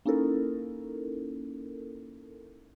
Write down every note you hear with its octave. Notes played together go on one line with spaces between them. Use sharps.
A#3 C#4 D#4 E4 A4 A#4